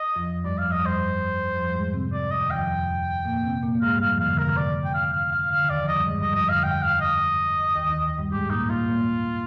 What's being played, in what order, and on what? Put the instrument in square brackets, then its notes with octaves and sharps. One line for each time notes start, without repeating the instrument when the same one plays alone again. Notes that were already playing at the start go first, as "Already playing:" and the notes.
Already playing: [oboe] D#5
[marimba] F2 F3
[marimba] G2 G3 [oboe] D5
[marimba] F2 F3 [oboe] F5
[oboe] D#5
[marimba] G2 G3 [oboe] C5
[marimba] F2 F3
G3
G#2 G#3
C3 C4
[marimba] C3 C4 [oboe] D5
[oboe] D#5
[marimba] D#2 D#3
[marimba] F2 F3 [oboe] G5
[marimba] A#2 A#3
C3 C4
A#2 A#3
A#3
[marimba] G#2 G#3 [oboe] F5
[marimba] G2 G3
[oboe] F5
[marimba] F2 F3
[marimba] D3 D#3 [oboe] F5
[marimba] C3 [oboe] A#4
[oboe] D5
G5
F5
F5
F5
[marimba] D3 [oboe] F5
[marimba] D#2 D#3
[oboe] D5
[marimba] F2 F3
[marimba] G2 G3 [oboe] D#5
[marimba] G#2 G#3
[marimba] G2 G3 [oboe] D#5
[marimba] F2 F3 [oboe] D#5
[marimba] D3 [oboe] F5
[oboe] G5
F5
D#5
[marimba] D#2 D#3
D#2 D#3
G2 G3
[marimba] G#2 G#3 [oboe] G4
[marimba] A#2 A#3 [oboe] D#4
[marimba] A#2 A#3 [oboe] F4
[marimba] A#2 A#3